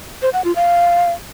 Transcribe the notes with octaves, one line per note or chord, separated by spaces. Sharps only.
C5
F#5
F4
F5